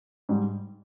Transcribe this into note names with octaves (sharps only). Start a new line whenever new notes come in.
G#2 G3